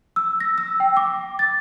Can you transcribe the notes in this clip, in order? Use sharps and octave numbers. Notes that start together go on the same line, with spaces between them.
E6
A#6
E6
G5
D6
A6